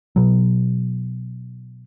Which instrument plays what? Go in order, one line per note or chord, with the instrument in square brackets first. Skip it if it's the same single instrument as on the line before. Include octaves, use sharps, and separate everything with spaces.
[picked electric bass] B2 F#3